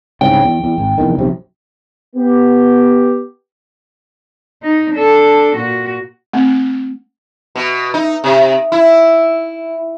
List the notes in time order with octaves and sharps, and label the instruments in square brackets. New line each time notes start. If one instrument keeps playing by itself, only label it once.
[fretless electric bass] C2 G#2 C#3 [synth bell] G5
[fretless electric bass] E2
E2
G#1
F1 E2 D#3
F1 B1 C3
[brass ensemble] B3 G4
[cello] D#4
D4 A4
A#2 F#4
[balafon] A3 C4
[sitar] B2
D#4
C3
E4